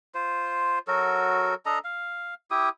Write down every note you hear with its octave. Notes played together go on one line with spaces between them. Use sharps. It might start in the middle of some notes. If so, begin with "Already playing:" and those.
F4 C5
F#3 F#4 A4 A#4
D4 A4 D#5 A#5
F5
E4 G4 D#6